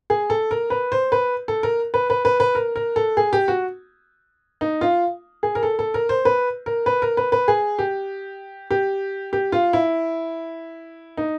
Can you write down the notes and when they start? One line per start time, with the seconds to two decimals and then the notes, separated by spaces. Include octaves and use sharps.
0.10 G#4
0.30 A4
0.51 A#4
0.70 B4
0.92 C5
1.12 B4
1.48 A4
1.63 A#4
1.94 B4
2.10 B4
2.25 B4
2.40 B4
2.55 A#4
2.76 A#4
2.96 A4
3.17 G#4
3.33 G4
3.48 F#4
4.61 D#4
4.81 F4
5.43 G#4
5.55 A#4
5.63 A4
5.79 A4
5.94 A#4
6.09 C5
6.25 B4
6.66 A#4
6.86 B4
7.02 A#4
7.17 B4
7.32 B4
7.48 G#4
7.79 G4
8.71 G4
9.33 G4
9.52 F4
9.73 E4
11.17 D#4